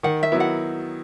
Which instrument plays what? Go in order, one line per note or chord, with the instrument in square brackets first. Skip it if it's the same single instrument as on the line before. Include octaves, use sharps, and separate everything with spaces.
[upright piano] D#3 [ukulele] F#5
[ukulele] E5
[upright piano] F#3 B3 E4
[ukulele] F#5